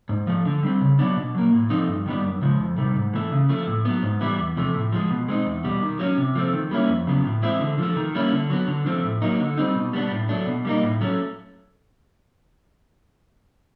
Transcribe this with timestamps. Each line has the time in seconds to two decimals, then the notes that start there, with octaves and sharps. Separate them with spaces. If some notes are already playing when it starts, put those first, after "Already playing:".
0.09 G#2
0.27 F3 A3
0.45 D3
0.63 G3 C4
0.81 C#3
0.99 F#3 B3 D4
1.17 B2
1.35 F#3 A#3
1.52 A2
1.70 F3 A3 C4 D#4
1.88 G2
2.06 D#3 G3 B3 D4
2.24 F#2
2.42 C#3 F3 G#3
2.60 F2
2.78 C3 D#3 G3
2.95 G#2
3.13 E3 A3
3.31 C#3
3.49 F3 A3
3.67 A2
3.85 F#3 B3
4.03 G#2
4.21 E3 G3 B3 E4
4.39 E2
4.57 C3 F3 A3
4.74 A2
4.92 F3 G#3
5.10 B2
5.28 G#3 C4 D#4
5.46 E2
5.64 B2 G3
5.82 D#3
5.99 F#3 A3 C#4
6.18 C3
6.35 F3 A3 C4
6.53 D#3
6.71 G3 A#3 C#4 E4
6.89 F2
7.07 C#3 F#3 B3
7.25 A2
7.43 E3 G#3 C4 E4
7.61 D3
7.78 F3 A3
7.97 D#3
8.14 G3 A#3 C#4 E4
8.32 D3
8.50 F#3 B3
8.68 D3
8.86 F3 A3 C4
9.04 A2
9.22 F#3 A#3 D#4
9.40 D3
9.57 G3 C4 D#4
9.75 B2
9.93 G3 B3 D4
10.11 A2
10.29 F#3 A3 D4
10.47 B2
10.65 G3 A#3 D#4
10.82 A2
11.01 F#3 A3 C#4